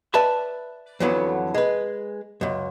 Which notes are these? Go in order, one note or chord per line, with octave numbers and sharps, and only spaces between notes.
B4 D5 E5 A5 B5
F2 D3 E3 F#3 B3
G#3 B4
C#2 F#2